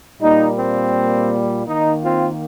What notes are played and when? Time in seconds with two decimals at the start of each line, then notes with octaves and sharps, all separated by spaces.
0.21 A#2 G3 A#3 D#4
0.58 C4
1.67 D#3 A#3 D#4
2.03 C4 F4